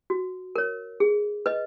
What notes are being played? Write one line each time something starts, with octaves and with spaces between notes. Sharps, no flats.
F#4
A#4 C#5
G#4
B4 D#5